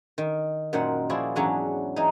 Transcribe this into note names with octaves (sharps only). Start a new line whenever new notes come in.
D#3
F#2 A#2 D#3 C5 F#5
F3 E4 F#4 G#4 C5 D5
E2 G#2 F#3 C#4 D4 F#5
E3 D#4